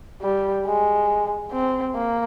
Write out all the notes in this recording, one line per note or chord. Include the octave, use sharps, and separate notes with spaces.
G3
G#3
C4
A#3